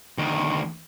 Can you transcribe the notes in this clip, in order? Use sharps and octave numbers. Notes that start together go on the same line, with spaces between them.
D2 D#3